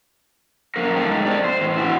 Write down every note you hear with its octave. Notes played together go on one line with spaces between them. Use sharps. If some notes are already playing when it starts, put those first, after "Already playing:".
F#2 F3 A#3 A#4
G#3 A3 D#4 G5
F2 C4 C5 D5
C5
A2 E3
E4 F#4